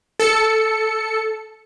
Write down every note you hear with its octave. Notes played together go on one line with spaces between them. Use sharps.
A4 C#7